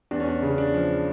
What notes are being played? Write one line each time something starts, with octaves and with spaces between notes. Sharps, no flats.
E2 D4
C#4
D4
C#3
D4
F3